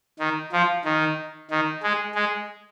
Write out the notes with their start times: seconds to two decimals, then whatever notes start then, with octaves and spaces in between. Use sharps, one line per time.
0.19 D#3
0.52 F3
0.85 D#3
1.51 D#3
1.83 G#3
2.15 G#3